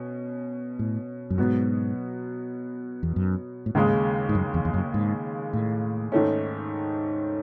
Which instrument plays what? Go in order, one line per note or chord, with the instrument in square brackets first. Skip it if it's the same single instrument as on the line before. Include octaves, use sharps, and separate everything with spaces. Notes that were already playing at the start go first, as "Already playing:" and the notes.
Already playing: [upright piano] B2 C#4
[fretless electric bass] A2
F#2
[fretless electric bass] G#2 [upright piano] B2 F#3 B3 F#4
[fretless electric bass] E2
F#2
A2
[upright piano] D#2 C#3 G#3 [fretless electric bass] G#2
[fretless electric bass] G#2
F#2
E2
E2
F#2
G#2
A2
[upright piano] G#2 D#3 A3 C#4